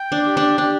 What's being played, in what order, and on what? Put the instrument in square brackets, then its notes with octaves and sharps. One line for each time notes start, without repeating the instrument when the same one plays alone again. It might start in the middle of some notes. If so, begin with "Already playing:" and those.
Already playing: [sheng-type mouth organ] G5
[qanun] D4
[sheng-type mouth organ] G4
[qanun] D4
[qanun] D4 [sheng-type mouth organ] G4